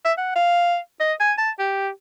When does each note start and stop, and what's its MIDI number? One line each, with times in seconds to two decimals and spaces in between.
0.05 0.13 76
0.18 0.35 78
0.35 0.77 77
1.00 1.13 75
1.20 1.33 80
1.38 1.51 81
1.59 1.90 67